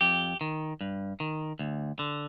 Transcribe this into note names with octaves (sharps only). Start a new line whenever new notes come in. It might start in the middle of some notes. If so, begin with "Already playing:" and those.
F2 G4
D#3
G2
D#3
D2
D3